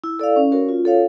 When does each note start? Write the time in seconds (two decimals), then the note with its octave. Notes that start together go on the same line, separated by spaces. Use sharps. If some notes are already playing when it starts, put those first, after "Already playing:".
0.04 E4
0.19 A4 D5 F5
0.36 C#4
0.52 F#4 A#4 C#5
0.69 F4
0.85 A4 C#5 F5